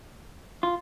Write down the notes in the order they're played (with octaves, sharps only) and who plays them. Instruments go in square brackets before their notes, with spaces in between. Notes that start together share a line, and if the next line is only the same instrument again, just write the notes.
[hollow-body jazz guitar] F4